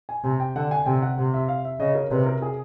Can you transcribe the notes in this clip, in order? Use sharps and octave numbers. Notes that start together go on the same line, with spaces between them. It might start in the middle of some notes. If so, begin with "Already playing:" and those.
G#5
C3 G#5
G5
D3 F#5
G#5
C3 G5
F#5
C3
E5
F5
E5
C#3 D#5
A#4
C3 B4
A#4
G#4